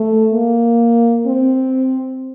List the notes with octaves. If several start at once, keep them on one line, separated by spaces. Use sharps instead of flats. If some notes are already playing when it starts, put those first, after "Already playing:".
Already playing: A3
A#3
C4